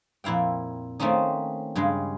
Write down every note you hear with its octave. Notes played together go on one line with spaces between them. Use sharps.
F2 A#2 E4 F5 G5
D#3 A3 A#3 C4 C#4 D#4
G2 C#3 G#3